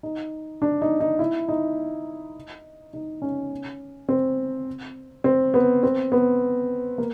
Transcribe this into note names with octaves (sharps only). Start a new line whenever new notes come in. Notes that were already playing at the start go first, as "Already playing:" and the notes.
D#4
D4
D#4
D#4
E4
D#4
D#4
C#4
C4
C4
B3
C4
B3
A#3